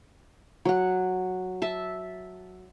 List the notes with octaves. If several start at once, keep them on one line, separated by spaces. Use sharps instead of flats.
F#3 F#5
E5 A5